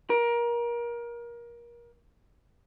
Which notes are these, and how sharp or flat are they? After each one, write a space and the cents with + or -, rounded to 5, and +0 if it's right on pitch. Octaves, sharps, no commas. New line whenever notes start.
A#4 +25